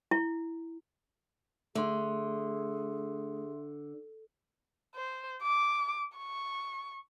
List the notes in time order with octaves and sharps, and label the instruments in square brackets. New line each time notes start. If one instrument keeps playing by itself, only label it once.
[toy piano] E4
[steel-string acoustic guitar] D3 [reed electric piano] A3 [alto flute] G#4 [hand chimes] E5 C6
[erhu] C5
D6
C#6